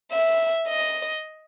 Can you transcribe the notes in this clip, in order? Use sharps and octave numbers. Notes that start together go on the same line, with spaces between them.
E5
D#5